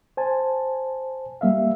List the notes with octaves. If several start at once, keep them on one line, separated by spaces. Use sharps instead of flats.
C5 G#5 A5
G3 A#3 E5 F5